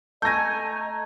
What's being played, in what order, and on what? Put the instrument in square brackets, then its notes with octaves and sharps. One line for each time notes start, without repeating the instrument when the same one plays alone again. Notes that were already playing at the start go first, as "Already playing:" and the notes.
[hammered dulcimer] A3 G#5 [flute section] D#5 A#5 [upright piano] G6 A#6